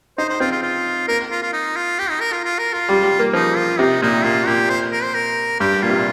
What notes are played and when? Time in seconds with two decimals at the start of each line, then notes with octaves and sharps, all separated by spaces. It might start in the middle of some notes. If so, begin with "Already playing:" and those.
0.18 D#4 C5
0.29 C5
0.40 C4 F4
0.52 F4
0.63 F4
1.08 A#3 A#4
1.31 F4
1.42 F4
1.53 D#4
1.76 F4
1.99 G4
2.10 D#4
2.21 A#4
2.33 F4
2.44 F4
2.59 A#4
2.73 F4
2.89 G3
3.03 G3
3.19 A#3
3.33 F3 D#4
3.57 F4
3.79 C3 D#4
4.02 A#2 D#4
4.24 A#2 F4
4.46 A#2 G4
4.70 C5
4.92 A#4
5.04 C5
5.15 A#4
5.60 G2 G4
5.82 A#2 F4
5.89 C3
5.96 A#2